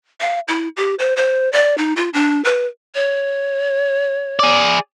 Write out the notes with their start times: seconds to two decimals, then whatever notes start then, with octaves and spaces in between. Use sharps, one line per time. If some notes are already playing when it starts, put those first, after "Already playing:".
0.20 F5
0.48 E4
0.77 G4
0.99 C5
1.16 C5
1.52 D5
1.78 D#4
1.96 F4
2.13 D4
2.44 B4
2.95 C#5
4.39 G#4 D5